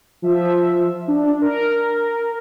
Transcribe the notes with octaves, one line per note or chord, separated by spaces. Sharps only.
F3 E5
D4
A#4